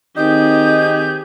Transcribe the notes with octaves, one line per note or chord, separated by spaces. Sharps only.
D#3 C4 D#4 G4 G#4 D#5 G6